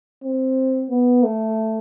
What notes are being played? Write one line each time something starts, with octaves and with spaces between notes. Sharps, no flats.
C4
B3
A3